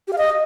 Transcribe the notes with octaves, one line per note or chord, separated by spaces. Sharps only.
G4
F5
D#5